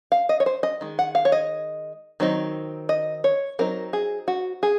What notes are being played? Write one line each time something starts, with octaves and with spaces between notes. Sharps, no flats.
F5
D#5
C#5
C5
D#5
D#3 G#3
F#5
F5
C#5
D#5
D#3 F#3 C4 D#4
D#5
C#5
F#3 C4 D#4 A#4
G#4
F#4
G#4